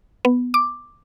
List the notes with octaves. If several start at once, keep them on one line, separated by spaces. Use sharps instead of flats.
B3
D6